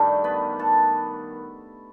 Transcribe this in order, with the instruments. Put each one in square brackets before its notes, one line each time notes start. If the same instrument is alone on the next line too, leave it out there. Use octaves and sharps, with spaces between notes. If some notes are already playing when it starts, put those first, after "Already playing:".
Already playing: [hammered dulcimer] G2 D#3 G3 A3 A4
B3 B4
A4 A5